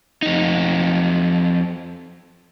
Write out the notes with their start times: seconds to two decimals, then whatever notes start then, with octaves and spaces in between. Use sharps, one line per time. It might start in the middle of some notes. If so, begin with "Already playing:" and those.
0.22 F2 D#4